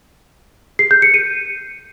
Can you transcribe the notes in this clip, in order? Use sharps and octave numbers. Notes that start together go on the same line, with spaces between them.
C7
G6
C#7
D#7